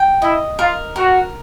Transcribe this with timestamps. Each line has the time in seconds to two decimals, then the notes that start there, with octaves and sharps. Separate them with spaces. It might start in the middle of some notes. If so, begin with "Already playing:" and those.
Already playing: G5
0.22 E4 D#5
0.59 F4 A#4
0.96 F#4 A#4